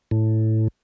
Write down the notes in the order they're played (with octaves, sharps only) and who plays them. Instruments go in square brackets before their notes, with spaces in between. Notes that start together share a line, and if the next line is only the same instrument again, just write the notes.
[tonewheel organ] A2